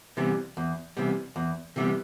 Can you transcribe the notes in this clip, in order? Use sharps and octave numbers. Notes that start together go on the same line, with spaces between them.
C3 E3 G3 B3
E2
C3 E3 G3 B3
E2
C3 E3 G3 B3